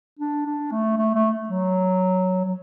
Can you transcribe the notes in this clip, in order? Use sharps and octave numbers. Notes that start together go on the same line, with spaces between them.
D4
D4
A3
A3
A3
F#3
F#3